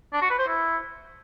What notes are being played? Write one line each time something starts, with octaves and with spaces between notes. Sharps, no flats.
D4
F#4
B4
C5
E4